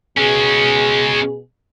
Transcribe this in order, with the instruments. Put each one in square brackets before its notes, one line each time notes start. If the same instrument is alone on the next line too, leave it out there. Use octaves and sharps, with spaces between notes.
[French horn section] B2 G#4 [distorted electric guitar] G#3 C#4